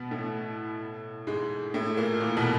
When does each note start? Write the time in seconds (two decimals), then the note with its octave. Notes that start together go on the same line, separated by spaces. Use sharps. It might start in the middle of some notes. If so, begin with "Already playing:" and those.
Already playing: B2 B3
0.11 A2 A3
1.27 G#2 G#3
1.74 A2 A3
1.97 A#2 A#3
2.20 A#2 A#3
2.37 B2 B3